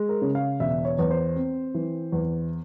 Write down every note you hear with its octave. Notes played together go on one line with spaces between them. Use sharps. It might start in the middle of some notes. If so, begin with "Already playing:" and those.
Already playing: G#3
A#4
C#3
F5
E1 E5
C#5
E2
C5
C4
E3
E2